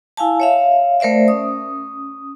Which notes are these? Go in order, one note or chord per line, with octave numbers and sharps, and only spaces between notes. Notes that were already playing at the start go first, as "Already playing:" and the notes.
E4 F5 G#5 A5
C#5 E5 F5
A3 A#4 C5 D5 E5
C#4 D#6